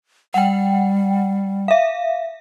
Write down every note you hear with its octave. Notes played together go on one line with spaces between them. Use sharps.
G3 F#5 G5
E5 F5